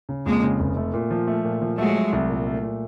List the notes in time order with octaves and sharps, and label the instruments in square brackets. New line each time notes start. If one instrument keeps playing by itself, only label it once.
[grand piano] C#3
[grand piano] F2 [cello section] G#3 A#3
[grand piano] C#3
F1
A3
A#2
F3
A3
A#2
F3
[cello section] F#3 G#3 [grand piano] A3
[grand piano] A3
C2
A#2
A3
A#2